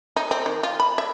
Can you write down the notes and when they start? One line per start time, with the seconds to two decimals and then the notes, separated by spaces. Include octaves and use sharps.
0.16 D#4
0.31 C4
0.46 D#3
0.63 F4
0.80 B5
0.98 E5